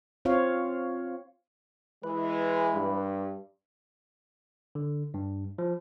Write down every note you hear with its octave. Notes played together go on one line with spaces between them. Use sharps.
C4 F4 C#5 F5
E3 G#3 B4
G2
D3
G2
F3